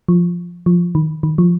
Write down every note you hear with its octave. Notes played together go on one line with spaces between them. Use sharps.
F3
F3
D#3
D#3
F3